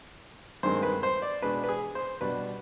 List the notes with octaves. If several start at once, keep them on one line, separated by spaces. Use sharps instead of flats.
G2 D#3 G#3 C4 C5
B4
C5
D5
B2 G#3 D4 B4
B4
G#4
C5
B2 G3 D4 B4